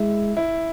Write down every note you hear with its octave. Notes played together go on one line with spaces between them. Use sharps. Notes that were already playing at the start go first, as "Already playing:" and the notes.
Already playing: G#3 E4
E4